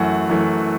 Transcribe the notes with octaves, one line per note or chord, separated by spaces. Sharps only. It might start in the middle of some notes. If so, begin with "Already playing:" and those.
Already playing: F#2 E3 A3 F#5
F#2 E3 A3